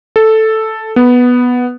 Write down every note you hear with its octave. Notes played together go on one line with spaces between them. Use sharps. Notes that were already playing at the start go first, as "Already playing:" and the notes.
A4
B3